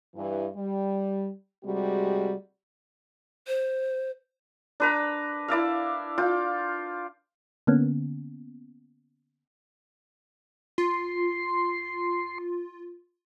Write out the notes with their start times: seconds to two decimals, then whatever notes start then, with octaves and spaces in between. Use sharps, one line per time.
0.15 G2 E3
0.56 G3
1.65 C3 G3 G#3 F#4
3.47 C5
4.80 D4 B4 A#5
5.48 E4 D5 E5 F5
6.18 F4 G5
7.67 D3 A#3 B3 C#4
10.78 F4 C6